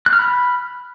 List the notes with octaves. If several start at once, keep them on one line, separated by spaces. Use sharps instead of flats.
F#6
F6
B5